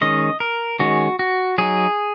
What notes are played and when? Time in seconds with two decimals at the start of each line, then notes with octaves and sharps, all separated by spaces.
0.01 D#3 G#3 C#4 D#5
0.40 A#4
0.79 D#3 G#3 C#4 F#4
1.19 F#4
1.58 F#3 D#4 G#4